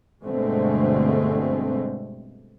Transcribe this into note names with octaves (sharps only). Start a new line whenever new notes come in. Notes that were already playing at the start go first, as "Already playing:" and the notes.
G1 B2 D3 G#3 A3 C4